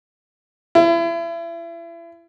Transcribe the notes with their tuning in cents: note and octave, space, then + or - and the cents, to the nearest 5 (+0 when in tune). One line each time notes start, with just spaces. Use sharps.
E4 +35